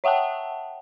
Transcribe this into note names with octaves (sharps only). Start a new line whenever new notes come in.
C#5 E5 F#5 G5 A5